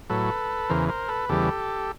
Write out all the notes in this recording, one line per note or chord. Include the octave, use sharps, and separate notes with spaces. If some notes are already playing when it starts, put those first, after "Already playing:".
A2 F#3 A4 B4
E2 C#3 E3 A#4 C5
A#4 C5
A4 B4
E2 C#3 E3 G3 G4 A4